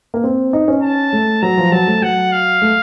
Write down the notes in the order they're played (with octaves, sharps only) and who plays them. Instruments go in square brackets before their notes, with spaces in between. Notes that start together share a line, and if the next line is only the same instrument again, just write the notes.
[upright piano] A#3
C4
D#4
C#4
[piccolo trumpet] A5
[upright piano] A3
[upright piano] F#3 [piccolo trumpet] A#5
[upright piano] F3
[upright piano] F#3 [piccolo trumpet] A5
[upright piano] A3
[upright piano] F#3 [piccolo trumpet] F#5
[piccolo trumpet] F5
[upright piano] A3